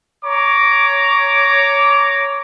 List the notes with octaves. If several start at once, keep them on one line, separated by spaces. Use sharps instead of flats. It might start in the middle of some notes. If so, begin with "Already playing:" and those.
C#5 A#5 D6